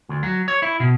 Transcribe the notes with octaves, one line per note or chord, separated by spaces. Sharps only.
D2
F#3
C#5
E4
B2